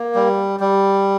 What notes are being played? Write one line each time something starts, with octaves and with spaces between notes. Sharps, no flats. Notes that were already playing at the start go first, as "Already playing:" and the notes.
Already playing: A#3
G3
G3